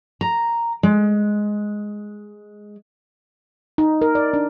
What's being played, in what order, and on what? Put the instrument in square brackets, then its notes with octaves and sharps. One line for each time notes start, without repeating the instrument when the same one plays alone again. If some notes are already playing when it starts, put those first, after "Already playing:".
[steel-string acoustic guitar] A#5
G#3
[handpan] D#4
A#4
D5
D4